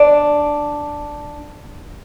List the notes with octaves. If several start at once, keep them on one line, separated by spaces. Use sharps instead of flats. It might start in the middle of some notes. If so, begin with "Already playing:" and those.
Already playing: D4